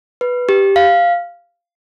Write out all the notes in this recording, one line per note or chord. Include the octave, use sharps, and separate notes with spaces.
B4
G4
F5